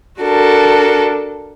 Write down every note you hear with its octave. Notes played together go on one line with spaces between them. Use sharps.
D4 F#4 A4 A#4